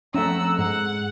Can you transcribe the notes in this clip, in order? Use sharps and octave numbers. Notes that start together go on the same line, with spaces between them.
F2 A3 C#4 F#5 A#5 E6
G#2 G#3 F#5